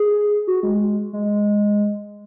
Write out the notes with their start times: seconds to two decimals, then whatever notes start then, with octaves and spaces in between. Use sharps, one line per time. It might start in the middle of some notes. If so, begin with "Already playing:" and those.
Already playing: G#4
0.47 F#4
0.63 G#3
1.13 G#3